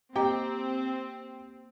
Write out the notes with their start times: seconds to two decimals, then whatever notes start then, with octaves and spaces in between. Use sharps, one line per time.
0.16 A#3 C4 G4 D#5 G5 A#5